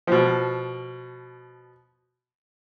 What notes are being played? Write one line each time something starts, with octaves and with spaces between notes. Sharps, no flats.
B2 F3